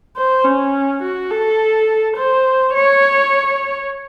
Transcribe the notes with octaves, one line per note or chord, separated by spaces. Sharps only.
C5
C#4
F#4
A4
C5
C#5